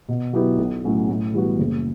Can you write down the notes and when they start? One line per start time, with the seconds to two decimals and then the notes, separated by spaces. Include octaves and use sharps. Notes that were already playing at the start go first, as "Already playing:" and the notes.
0.08 B2
0.33 F#3 B3 E4 G4
0.58 B1
0.84 A2 F#3 C#4 F#4
1.09 A2
1.34 E3 G3 B3 F#4
1.58 F#1